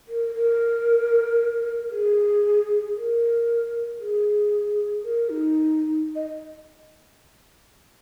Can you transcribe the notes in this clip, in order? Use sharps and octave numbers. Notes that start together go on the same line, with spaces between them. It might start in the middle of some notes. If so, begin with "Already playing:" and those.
A#4
A#4
G#4
A#4
G#4
A#4
D#4
D#5